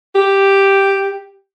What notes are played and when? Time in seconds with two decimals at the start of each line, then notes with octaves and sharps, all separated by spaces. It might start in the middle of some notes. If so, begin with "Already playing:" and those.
0.15 G4